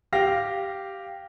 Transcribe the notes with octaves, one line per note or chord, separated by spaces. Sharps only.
G4 F5 G5 A#6